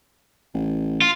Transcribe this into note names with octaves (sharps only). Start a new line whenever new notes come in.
A1
F4